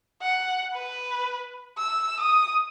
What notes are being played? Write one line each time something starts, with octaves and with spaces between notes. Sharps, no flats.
F#5
B4
E6
D#6